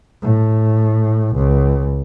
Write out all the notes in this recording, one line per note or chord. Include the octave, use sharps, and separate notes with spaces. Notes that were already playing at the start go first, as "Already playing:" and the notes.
A2
C#2